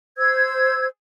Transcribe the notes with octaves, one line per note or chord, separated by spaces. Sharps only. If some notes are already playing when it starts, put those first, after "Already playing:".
C5 E6 G#6